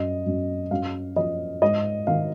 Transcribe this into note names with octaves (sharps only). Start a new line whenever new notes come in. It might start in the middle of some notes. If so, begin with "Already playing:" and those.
Already playing: F#2 D#5
F#2
F#2 F5
F3 D#5
G#2 D#5
D#3 F5